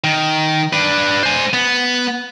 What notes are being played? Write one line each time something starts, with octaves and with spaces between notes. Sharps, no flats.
D#3
D4 B4
C5 G#5
B3